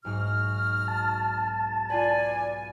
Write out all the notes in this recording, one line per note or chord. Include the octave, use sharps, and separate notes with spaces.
B1 G#2 B2 F#4 F6
A5
F4 B4 D5 G#5